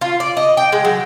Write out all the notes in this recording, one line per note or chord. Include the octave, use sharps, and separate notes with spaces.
F4
D5
D#5
G5
G#3
F#3